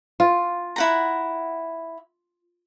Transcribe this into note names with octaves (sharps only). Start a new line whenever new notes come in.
F4
E4 F#5 A#5